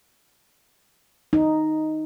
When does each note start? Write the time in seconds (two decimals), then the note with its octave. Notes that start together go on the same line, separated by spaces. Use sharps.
1.33 D#4